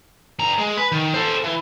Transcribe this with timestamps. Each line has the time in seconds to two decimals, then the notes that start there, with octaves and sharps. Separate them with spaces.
0.39 G2 A#5
0.59 G#3
0.77 B4
0.92 D#3
1.14 A4 C5
1.44 E3